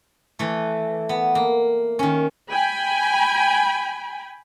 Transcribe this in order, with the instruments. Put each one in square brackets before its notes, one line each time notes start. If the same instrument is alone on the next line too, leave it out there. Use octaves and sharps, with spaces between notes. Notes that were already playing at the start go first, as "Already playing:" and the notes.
[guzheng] E3 A3
B3
A#3
D#3 C#4
[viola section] G5 G#5 B5